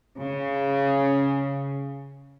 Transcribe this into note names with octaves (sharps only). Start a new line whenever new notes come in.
C#3